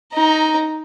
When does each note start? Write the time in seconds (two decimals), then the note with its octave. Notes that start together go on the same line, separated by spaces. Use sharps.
0.13 D#4 A#5